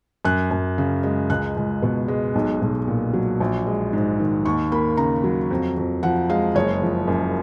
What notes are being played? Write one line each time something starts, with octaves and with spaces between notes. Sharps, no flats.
F#2 F#6
F#2
C#3
G#3
C#2 F#6
C#2
B2
G#3
B1
B1
A#2
F#3
A#1
G#3
G#2
D#3
D#2 C#6
A#3 B5
C#3 A#5
F#3
F2
F2
F3 F#5
G#3 F5
F#1 C#5
F3
F#2